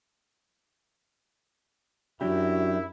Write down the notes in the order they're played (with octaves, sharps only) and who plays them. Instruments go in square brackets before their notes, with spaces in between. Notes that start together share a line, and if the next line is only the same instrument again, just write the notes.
[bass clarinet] F#2 [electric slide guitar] F#3 D4 G4 [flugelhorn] E4 [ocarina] F#4